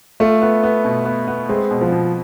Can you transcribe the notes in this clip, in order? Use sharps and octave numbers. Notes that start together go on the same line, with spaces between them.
A3 F4
B3
B3
B2
B3
B3
G#3 C4
B2
F3
B2